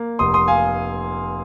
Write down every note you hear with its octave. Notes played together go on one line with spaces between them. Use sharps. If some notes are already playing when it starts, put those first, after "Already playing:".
Already playing: A#3
F1 C6 D#6
C6 D#6
F5 G#5